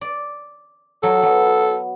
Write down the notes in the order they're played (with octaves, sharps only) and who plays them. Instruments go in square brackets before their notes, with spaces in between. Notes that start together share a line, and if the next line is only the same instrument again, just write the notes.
[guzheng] D5
[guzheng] F#3 [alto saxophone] A4
[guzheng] F#3 B3